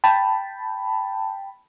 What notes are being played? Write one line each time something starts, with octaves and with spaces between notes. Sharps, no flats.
G5 A5 B5